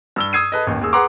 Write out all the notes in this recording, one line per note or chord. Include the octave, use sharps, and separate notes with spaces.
G2 E6 G7
D#6 E6 G#6 C7 D#7
A4 B4 D#5
A1 D#2
D#2 G#4 E6
G#4 B4 F#5 A#5 C6 D6